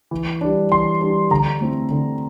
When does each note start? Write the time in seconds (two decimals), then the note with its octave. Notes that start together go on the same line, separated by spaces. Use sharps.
0.11 E3
0.41 G3 D4
0.71 E3 C6
1.01 G3 D4
1.31 D3 A#5
1.61 A3 C4 E4
1.91 D3